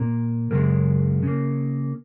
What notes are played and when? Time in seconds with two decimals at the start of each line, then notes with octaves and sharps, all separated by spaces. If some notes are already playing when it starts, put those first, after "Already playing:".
Already playing: A#2 A#3
0.51 F#2 C#3 G#3 A#4
1.23 C#3 A#3